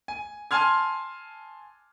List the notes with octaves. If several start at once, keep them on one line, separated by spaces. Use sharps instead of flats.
G#5
G#5 A5 C6 F6 G#6